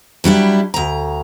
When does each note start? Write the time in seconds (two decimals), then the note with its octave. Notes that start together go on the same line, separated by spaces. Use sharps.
0.24 F#3 G3 D4 E4
0.74 D2 A#5